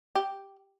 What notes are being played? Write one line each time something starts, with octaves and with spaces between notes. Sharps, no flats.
G4